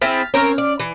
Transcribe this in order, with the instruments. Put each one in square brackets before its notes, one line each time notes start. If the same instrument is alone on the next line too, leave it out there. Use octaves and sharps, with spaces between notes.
[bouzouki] C4 E4 G#4 [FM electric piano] F6 A6 B6
[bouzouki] C4 A#4 C#5 [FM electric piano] C#4 F6
[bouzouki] D5
E3